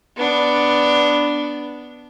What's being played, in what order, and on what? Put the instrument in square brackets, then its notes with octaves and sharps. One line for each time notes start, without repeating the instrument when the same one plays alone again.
[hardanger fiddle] B3 D4